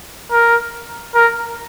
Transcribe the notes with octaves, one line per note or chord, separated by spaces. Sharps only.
A#4
A#4